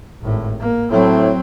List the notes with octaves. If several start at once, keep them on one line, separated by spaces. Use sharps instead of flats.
G#1 A2
A#3
A2 F#3 C4